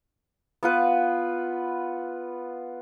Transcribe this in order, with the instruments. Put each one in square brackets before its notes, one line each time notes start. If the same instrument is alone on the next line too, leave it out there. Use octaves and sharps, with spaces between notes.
[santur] B3 F4 B4